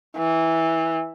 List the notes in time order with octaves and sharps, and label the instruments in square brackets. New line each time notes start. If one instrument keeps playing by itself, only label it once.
[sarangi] E3